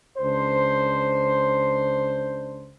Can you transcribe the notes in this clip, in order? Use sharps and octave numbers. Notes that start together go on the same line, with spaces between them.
C#2 D4 C5